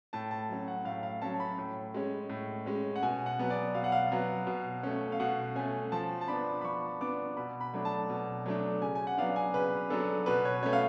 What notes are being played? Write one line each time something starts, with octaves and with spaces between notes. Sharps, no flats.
A2 A5
A5
F#3 C#4
F#5
A2 F5
F5
F#3 C#4 A5
A5
B5
A2
G#3 C#4
A2
G#3 C#4
F#5
B2 G#5
F#5
F#3 B3
D5
B2 F5
F#5
F5
F#3 B3
B2
A3 C#4
F5
B2 F#5
A3 C#4 G#5
F3 A5
A5
B3 D4 B5
B5
F3 C#6
B3 D4 D6
B2 B5
B5
F#3 A3 D4
A5
B2
F#3 A3 D4
C#3 G#5
G#5
F#5
F#3 B3 D4 F5
G#5
C#3 B4
F#3 B3 D4 A4
B2 B4
C#5
A3 C#4 C#5
F5